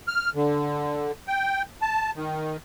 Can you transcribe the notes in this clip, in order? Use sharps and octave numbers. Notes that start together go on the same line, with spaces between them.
F6
D3
G5
A5
D#3